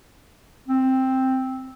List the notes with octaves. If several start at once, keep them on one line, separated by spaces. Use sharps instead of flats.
C4